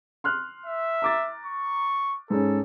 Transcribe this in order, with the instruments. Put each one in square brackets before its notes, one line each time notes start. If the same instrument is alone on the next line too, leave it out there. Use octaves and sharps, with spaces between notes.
[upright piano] C6 F6 F#6
[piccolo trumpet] E5
[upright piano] A#5 D6 A6
[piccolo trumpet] C#6
[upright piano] G#2 C#4 [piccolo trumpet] A4